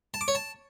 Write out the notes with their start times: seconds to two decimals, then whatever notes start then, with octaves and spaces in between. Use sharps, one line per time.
0.14 A5
0.21 D6
0.28 C#5
0.35 A5